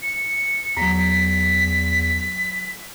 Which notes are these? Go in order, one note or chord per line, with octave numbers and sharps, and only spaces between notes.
C#7
E2 F#3 A5 A#5 B6